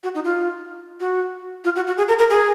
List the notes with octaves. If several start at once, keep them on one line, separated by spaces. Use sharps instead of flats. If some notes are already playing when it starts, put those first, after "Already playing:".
F#4
D#4
F4
F#4
F4
F#4
F#4
G#4
A#4
A#4
G#4